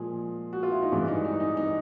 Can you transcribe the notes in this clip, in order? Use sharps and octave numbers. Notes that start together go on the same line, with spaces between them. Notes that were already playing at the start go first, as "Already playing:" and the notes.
Already playing: A#2 F3 G#3 G#4
F#4
F4
E4
D#4
G2 E3 G#3 D4
D#4
D#4
D#4
D#4